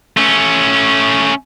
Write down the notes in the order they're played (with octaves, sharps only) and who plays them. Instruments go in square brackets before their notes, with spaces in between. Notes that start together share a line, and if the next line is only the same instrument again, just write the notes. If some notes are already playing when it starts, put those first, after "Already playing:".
[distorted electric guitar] A3 C#4